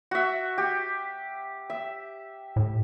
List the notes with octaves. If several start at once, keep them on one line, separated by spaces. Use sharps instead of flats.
F#4 E5
G4
E5
A2